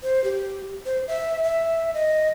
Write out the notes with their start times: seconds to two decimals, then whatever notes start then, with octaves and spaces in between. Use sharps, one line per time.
0.03 C5
0.24 G4
0.86 C5
1.08 E5
1.44 E5
1.94 D#5